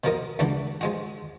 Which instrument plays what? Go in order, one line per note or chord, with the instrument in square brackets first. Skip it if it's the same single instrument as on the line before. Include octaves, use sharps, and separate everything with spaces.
[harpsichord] B2 F3 A#4 D#5
C#2 E3 D4 F#4
F3 G#3 F#4